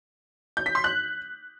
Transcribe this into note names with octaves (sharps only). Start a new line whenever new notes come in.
G6
B6
C6
F#6